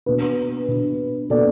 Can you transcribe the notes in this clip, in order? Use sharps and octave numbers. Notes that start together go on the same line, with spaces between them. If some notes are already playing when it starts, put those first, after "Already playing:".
B2 B3 D4 B4
B2 B3 D4
B2 B3 D4 A4 D5